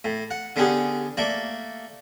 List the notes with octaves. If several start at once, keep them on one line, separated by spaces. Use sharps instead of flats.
A2
F#5
D3 B3 C#4 G4 G#4
A3 A#3 D5